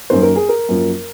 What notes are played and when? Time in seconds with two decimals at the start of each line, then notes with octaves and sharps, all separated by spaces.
0.10 F#2 D#3 A#3 C5
0.22 A#4
0.36 G#4
0.49 A#4
0.69 F#2 F3 A#3